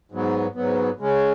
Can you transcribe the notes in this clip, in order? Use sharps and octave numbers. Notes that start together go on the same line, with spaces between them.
G#2 F#3 B3
G#2 F#3 B3
C#3 G#3 C#4